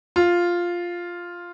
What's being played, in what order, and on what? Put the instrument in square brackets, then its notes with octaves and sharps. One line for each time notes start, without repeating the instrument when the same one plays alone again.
[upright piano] F4